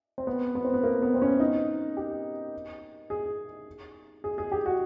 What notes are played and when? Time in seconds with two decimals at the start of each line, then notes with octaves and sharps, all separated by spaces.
0.18 C4
0.27 B3
0.55 B3
0.64 C4
0.74 B3
0.83 A#3
1.02 B3
1.14 C4
1.22 C#4
1.40 D#4
1.97 G4
3.10 G#4
4.24 G#4
4.38 G#4
4.52 G4
4.66 F#4